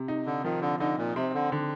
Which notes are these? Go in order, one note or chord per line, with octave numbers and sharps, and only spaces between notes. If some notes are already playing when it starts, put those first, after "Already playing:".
Already playing: C3
D#4
D3
D#3 F3
D3
D3 D#4
A#2
C3 C4
D3
D3